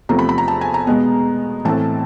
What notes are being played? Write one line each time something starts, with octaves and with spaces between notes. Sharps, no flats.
E2 C3 F3 A3 C4 A#5
B5
B5
A#5
A5
G#5
A#5
B2 G#3 B3
A2 E3 A3 C4 A5